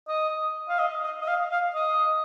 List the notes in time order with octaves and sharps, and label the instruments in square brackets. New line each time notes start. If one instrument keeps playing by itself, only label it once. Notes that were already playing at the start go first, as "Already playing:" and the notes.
[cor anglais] D#5
F5
D#5
D#5
D#5
F5
F5
D#5